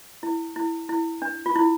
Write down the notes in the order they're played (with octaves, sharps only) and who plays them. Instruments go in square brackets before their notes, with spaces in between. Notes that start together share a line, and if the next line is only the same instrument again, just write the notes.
[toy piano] E4
E4
E4
D4
F4
E4